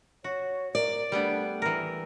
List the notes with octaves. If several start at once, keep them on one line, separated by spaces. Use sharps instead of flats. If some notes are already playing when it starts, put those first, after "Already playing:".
F#4 C#5
A#4 D5
G3 A3 B3 D4
E3 A#4